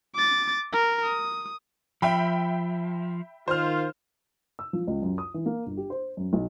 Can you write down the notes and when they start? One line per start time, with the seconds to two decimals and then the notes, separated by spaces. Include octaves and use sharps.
0.15 D6 A6
0.72 A#4
1.03 D#6
2.02 F3 E5 G5 B5
3.48 D#3 F4 C5 F6
4.59 E6
4.73 F3
4.87 C#2
5.02 F#2
5.18 D#6
5.34 E3
5.46 A#3
5.66 G1
5.77 G4
5.90 C5
6.17 F#2
6.33 B1